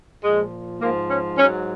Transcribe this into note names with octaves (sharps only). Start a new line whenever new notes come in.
A#2 F3 G#3
G#2 F3 A#3
C#4
G#2 F#3 C#4